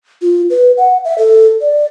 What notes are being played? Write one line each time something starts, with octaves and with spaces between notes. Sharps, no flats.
F4
B4
F#5
E5
A4
D5